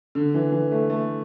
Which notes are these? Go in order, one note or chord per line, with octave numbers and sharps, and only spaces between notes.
D3
E3
E3
A3
A3